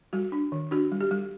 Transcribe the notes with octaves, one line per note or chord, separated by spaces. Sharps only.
G3 F#4
D4
D#3
D4 F#4
G3
G4
G3